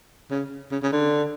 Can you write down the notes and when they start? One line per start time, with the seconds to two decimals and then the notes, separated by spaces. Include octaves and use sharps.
0.30 C#3
0.71 C#3
0.83 C#3
0.92 D3